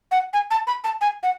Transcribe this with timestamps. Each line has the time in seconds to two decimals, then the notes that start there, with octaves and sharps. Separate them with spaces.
0.11 F#5
0.33 G#5
0.51 A5
0.67 B5
0.84 A5
1.01 G#5
1.23 F#5